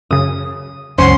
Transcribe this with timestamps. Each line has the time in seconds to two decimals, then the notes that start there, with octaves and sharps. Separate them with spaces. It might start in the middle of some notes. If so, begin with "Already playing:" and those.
0.11 F#2 C#3 D#6
0.98 C#2 F#2 C#4 C5 F#5 C6